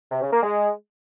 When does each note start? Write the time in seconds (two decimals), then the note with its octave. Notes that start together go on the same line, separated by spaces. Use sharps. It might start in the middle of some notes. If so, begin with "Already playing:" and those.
0.12 C3
0.22 C#3
0.33 A#3
0.43 G#3